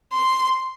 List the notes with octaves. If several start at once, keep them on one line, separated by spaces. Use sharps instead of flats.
C6